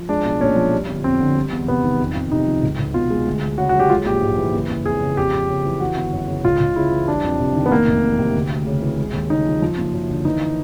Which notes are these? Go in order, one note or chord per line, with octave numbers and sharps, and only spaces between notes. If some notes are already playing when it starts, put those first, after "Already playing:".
Already playing: F3
G#3 D4
B1
A#2 C#4
F3
G3
G1
F2 C4
D3
G3
E2
C3 B3
D#3
F2
F2
C3 D#4
F3
C#2
C#2
B2 F4
G#3
D2
D2
C#3 F#4
F#4
F#3
G4
G#3 F4
A#1 G4
G#2
E3
F#1
F#1
F2 G#4
C#3
F2 G4
F2
C#3
E3
E3 F#4
G1
F#2
C#3
C#2 F4
C#2
C#3 E4
E3
G3 D4
F2
C3
D#3
B3
F1 A#3
F1
E2
C3
D2
D2
C#3
E3
G#3
D#2
C#3 D#4
F3
F3
F#1
F#2
D3
E3 D#4